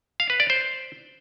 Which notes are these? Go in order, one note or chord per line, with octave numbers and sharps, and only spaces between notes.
F5
B4
D5
C5